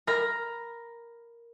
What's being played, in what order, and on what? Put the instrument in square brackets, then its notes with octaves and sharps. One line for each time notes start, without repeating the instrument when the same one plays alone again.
[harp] A#4 A#5 B5 F6 A#6